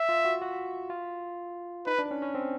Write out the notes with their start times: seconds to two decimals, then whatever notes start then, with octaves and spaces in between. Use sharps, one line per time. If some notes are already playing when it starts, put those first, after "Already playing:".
Already playing: E5
0.09 F4
0.25 F#4
0.42 F#4
0.90 F4
1.86 D#4 B4
1.99 D4
2.11 C#4
2.22 C#4
2.35 C4